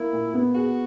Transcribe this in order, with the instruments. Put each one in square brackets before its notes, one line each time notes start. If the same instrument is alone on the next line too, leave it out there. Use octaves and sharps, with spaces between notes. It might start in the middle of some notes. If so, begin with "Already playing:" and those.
Already playing: [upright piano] A#3 [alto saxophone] E4
[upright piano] A#2
B3
[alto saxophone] F#4 [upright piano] G#4